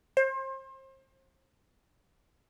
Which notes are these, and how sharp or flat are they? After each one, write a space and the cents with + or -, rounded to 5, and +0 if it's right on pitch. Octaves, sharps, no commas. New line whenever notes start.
C5 +30